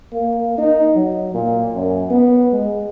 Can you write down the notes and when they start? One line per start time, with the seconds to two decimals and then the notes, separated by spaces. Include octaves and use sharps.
0.13 A#3
0.58 D#4
0.96 F#3
1.34 A#2
1.74 F#2
2.10 B3
2.53 G#3